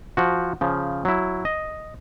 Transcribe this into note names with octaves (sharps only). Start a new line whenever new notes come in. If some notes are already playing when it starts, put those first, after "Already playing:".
F3 F#4
C#3 F3
F#3 E4
D#5